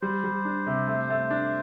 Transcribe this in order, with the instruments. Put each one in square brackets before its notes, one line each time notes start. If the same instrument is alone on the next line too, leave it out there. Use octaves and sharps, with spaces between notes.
[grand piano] G3 [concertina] C5
[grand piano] G3
D4
C3
A3
A3
D4